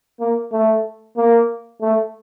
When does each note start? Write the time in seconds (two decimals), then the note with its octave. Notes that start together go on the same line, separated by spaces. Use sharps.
0.20 A#3
0.52 A3
1.17 A#3
1.81 A3